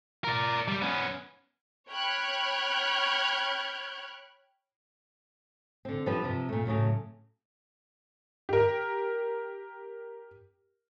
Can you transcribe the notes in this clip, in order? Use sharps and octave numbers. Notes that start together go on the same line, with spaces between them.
A#4 D5
G3
B3 C#4
C#5 G5 B5 F6 F#6 G#6
D3 C4
G2 F3 G4 B4
C3 F3
A#2 A3
A2 C#3 F#3 A3
G4 A#4